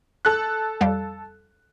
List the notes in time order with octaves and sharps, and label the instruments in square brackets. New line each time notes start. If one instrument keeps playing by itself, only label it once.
[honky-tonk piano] A4 F#6
[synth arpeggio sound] F2 G3 F5